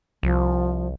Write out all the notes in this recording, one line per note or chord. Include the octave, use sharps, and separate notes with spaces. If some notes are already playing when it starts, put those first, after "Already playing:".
C2 F3